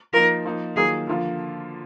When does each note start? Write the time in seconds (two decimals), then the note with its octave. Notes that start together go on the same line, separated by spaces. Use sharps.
0.13 F3 A#3 D#4 A#4
0.45 F3 A#3 D#4
0.76 D#3 F#3 A#3 F4 G#4 A#4
1.07 D3 F3 A#3 F4